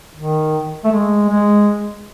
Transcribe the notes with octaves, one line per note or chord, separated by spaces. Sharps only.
D#3
A3
G#3
G#3